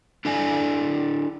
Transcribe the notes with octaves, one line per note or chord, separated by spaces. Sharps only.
D4 E4 A4 D5 G#5